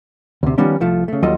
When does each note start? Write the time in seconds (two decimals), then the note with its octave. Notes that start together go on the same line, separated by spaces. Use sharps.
0.43 D2 C3
0.58 D#3 F3 G3 B3 C#4 D4
0.80 C2 F3 A3
1.08 C#3 A3
1.22 D#2 F#3 G3 F4 A4 D#5